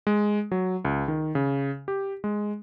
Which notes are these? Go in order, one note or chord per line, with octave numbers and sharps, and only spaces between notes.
G#3
F#3
C#2
D#3
C#3
G4
G#3